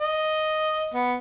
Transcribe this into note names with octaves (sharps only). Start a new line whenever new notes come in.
D#5
B3